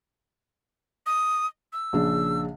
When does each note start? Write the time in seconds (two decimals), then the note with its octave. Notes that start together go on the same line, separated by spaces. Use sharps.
1.06 D#6
1.73 E6
1.93 A#1 C#3 D4